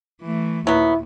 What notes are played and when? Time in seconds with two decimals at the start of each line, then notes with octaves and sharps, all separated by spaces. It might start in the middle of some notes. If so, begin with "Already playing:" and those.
0.22 E3 A3
0.67 D#2 A#2 F#3 B3 E4